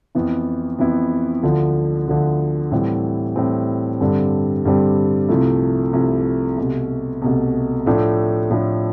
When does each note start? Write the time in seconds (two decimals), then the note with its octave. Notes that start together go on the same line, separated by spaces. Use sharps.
0.15 F2 E3 B3 E4
0.79 F2 E3 B3 E4
1.43 D2 D3 F3
2.08 D2 D3 F3
2.71 A2 E3 G3 C4
3.36 A2 E3 G3 C4
4.01 G2 D3 G3 C4
4.65 G2 D3 G3 C4
5.29 C2 C3 F3 A3 E4
5.93 C2 C3 F3 A3 E4
6.58 C2 B2 A3
7.22 C2 B2 A3
7.86 A2 F3 A3 D4
8.51 A2 F3 A3 D4